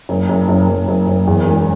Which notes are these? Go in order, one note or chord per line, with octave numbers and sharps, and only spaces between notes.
F#1
F#1
F#1
F#1
F#1
F#1
E2
E1